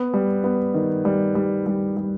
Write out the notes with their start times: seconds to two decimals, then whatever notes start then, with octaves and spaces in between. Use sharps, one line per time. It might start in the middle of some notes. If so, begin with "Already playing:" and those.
Already playing: B3
0.14 G3
0.44 B3
0.74 D#3
1.05 G3
1.35 G3
1.66 G3
1.97 G3